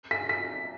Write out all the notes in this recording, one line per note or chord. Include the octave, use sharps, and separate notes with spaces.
B6
B6